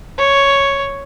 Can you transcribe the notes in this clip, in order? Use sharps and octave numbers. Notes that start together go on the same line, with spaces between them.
C#5